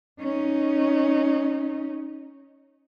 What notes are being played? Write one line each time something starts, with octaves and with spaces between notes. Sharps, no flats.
C#4 D#4